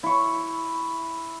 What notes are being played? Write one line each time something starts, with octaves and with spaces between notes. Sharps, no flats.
E4 C#6